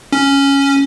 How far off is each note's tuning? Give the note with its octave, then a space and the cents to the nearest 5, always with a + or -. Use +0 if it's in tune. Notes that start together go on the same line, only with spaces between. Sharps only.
C#4 +0